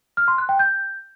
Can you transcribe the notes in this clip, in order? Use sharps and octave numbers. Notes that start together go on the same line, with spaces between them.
F6
C6
F#6
G5
G6